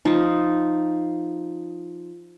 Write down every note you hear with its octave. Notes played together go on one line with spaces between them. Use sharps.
F3 D#4